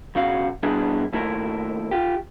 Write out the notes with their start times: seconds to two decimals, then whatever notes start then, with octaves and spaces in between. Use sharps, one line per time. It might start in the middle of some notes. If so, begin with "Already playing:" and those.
0.15 B1 C#3 F#4 F5
0.63 B2 G3 B3 D4 E4 G#4
1.13 D#2 A3 E4 A#4
1.91 F4 G4